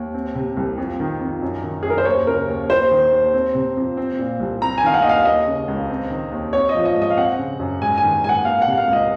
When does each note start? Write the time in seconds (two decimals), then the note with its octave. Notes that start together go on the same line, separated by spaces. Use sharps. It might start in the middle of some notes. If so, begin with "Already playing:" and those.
Already playing: D#2
0.14 C4
0.35 C3
0.57 C2
0.78 F2
1.00 D#3
1.21 F2
1.42 F#2
1.64 D#3
1.83 F#2 G#4
1.90 A#4
1.98 C5
2.05 D#2 C#5
2.27 C#3 A#4
2.48 D#2
2.70 D#2 C5
2.91 D#3
3.12 D#2
3.33 C4
3.55 C3
3.77 F2
3.97 C4
4.19 A#2
4.40 C2
4.62 C4 A#5
4.78 G#5
4.83 D#3 F5
4.94 F#5
5.02 D#2 D#5
5.09 F5
5.25 A#3 D#5
5.47 C#3
5.68 C#2
5.90 C4
6.10 D#3
6.32 D#2
6.53 C4 C#5
6.69 D#5
6.75 F3
6.85 D#5
6.96 G#2
7.02 D#5
7.10 F5
7.17 C4 F#5
7.39 C#3
7.60 F#2
7.81 G#2 G#5
7.98 G#5
8.03 D#3
8.24 G#2 F#5 G#5
8.45 A#3 F5
8.62 F#5
8.67 C3
8.77 F5
8.87 C#2
8.93 D#5